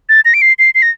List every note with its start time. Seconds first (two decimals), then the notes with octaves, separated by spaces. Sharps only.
0.09 A6
0.25 A#6
0.34 D7
0.42 C7
0.59 C7
0.75 C7
0.82 A#6